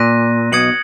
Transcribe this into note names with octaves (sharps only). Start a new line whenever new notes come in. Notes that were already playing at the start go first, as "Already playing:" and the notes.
Already playing: A#2 F#6 A#6 D#7
B1 B2 D#6 G#6 C#7 F#7